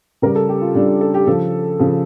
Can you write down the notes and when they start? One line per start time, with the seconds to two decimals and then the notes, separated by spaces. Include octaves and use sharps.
0.22 C#3 G3 A#4
0.36 A4
0.49 G4
0.61 F4
0.75 C#3 G3 D4
1.01 A4
1.14 G4
1.27 C#3 F3 A4
1.79 C#3 F3